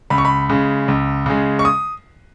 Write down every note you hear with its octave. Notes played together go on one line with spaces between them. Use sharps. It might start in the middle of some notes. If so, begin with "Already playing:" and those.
C#2 B5
C#6
B5
C#3 G#3
C#2
C#3 G#3
C#6
D#6